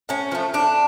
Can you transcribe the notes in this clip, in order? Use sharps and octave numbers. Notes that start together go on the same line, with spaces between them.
A2 C#4
F3 A3
A2 D4